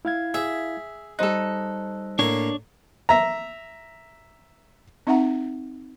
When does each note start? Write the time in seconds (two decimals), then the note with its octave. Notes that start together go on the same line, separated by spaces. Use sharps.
0.05 E4 F5 G#6
0.34 G#4 E5
1.19 G3 D#4 A4 C5 F#6
2.19 A2 A#3 D4 C#5
3.09 E5 A#5
5.07 C4 D#4 E5 F#5 A#5